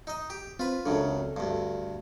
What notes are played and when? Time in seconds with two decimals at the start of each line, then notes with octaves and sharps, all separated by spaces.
0.07 D#4 D#5
0.30 G4
0.59 C4 F4 B4
0.86 C#2 F#2 C#3 C4 D4 A4
1.37 D2 G2